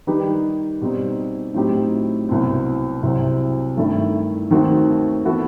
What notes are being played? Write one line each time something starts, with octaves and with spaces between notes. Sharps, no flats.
D#3 G3 D#4 G4 B4
B2 G3 C4 D#4
A2 F#3 C4 D#4 G4
C2 B2 F#3 C4
C2 C3 F#3 C4
G2 D#3 A3 E4 A4
D#2 D#3 A3 C4 F#4
E3 B3 F#4 A4